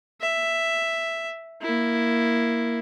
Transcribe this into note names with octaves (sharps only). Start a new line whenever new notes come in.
E5
A#3 E4